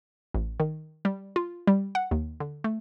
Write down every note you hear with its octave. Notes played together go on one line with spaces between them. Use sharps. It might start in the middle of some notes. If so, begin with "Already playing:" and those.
A1
D#3
G3
F4
G3
F#5
D#2
D3
A3